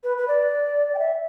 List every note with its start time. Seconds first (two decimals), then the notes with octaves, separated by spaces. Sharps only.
0.04 B4
0.18 B4
0.28 D5
0.95 G5
0.99 E5